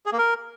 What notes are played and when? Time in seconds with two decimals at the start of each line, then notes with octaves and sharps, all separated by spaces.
0.06 G#4
0.12 A#3
0.18 A#4